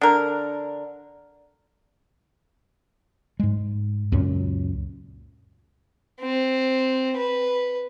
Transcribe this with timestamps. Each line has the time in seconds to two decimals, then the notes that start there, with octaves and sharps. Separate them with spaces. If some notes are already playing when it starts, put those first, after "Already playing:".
0.01 D3 A#4
3.40 G#2 G#3
4.12 C#2 F#2 A#2 C#4
6.20 C4
7.17 B4